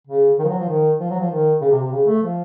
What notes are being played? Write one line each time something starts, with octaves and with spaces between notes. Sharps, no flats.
C#3
D#3
F3
F#3
F3
D#3
F3
F#3
F3
D#3
C#3
C3
C3
C#3
A3
F3